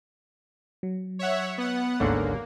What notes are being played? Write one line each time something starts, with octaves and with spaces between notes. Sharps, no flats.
F#3
C#5 E5 F#5
B3 F#5
G#1 D2 G#2 D3 A#3 C#5